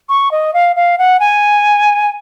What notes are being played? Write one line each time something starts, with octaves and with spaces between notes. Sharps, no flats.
C#6
D#5
F5
F5
F#5
G#5